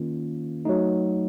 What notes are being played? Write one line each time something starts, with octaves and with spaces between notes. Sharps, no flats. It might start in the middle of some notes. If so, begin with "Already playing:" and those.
Already playing: D#3 A#3 C#4 F4
F#3 A3 D#4